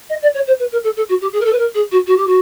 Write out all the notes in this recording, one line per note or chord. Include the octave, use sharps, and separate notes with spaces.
D#5
D5
C#5
C5
B4
A#4
A4
A4
F#4
G4
G#4
A#4
A4
B4
A#4
G#4
F#4
F#4
G4
F#4